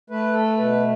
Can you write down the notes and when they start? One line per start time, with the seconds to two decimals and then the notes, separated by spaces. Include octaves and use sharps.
0.10 A3 B4
0.34 A4
0.57 B2 B4